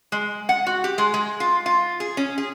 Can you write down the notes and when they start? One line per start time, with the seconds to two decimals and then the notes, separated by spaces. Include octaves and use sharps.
0.12 G#3
0.49 F#5
0.67 F#4
0.84 G4
0.98 G#3
1.14 G#3
1.40 F4
1.66 F4
2.00 G#4
2.17 C#4
2.38 G#4